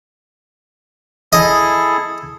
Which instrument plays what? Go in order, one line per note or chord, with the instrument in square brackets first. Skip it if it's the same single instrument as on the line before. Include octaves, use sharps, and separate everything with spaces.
[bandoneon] E4 G#4 A4 [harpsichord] D#5